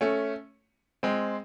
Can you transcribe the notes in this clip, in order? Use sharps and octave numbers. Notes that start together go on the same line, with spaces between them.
A3 C#4
G#3 C4